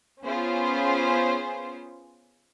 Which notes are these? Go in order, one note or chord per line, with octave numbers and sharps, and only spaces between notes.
B3 C#4 F4 G#4 C5